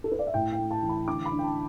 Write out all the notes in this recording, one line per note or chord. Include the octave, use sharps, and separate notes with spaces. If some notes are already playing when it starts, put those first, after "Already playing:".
A4
B4
D5
E5
A2 G5
G5
A3
A5
E3
B5
D3 D6
B5
D4
G5
A5